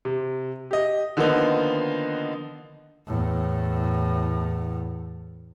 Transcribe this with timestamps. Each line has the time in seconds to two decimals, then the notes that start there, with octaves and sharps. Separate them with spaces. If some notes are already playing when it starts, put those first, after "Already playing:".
0.05 C3
0.71 G4 D#5
1.17 D3 D#3 F3 A#3 B3 D#4
3.07 E2 A2